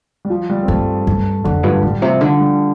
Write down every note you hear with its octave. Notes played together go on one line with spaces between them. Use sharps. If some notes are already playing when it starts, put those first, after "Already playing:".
G3
F3
G3
C4
G2 A3
G2
F2 D3
G2 F3
A2 G3
C3 F3
D3 A3
G3